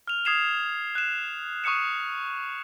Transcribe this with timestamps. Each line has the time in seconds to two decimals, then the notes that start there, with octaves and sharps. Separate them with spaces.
0.08 F6 F7
0.25 D#6 G#6 C7 E7 F7
0.95 F#6 E7
1.64 C#6 D#6 F#6 C#7 E7